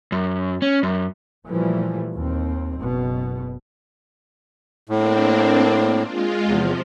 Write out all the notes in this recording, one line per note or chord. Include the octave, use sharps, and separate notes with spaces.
F#2
C#4
F#2
A#2 E3 F3 G3 A3
D#2 C4
F#1 B2
A2 A#3 C4 D4
G#3 F4
E2 C3 F3